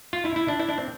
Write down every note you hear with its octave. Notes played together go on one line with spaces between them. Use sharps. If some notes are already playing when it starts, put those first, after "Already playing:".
F4
E4
E4
D4
E4
D4
C4